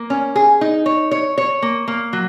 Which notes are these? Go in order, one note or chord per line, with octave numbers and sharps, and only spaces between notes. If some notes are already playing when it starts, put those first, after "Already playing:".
Already playing: A#3
C#4
G#4
D#4
C#5
C#5
C#5
A#3
A#3
F#3